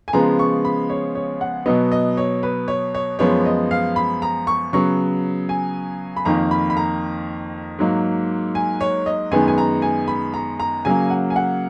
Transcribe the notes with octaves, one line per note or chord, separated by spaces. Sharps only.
G#5
C#3 F3 G#3 B3 A#5
C#6
B5
C#5
C#5
F#5
B2 F#3 B3 D#5
D#5
C#5
B4
C#5
C#5
F#2 F3 G#3 B3 C#5
D#5
F5
B5
A#5
C#6
C#3 F#3 B3 C#6
G#5
B5
F2 D#3 A#3 A#5
B5
B5
A#5
G#2 F#3 A#3
G#5
C#5
D#5
F#2 D#3 G#3 B3 G#5
G#5
A#5
G#5
B5
A#5
A#5
C#3 F#3 A#3 G#5
F#5
G#5
F#5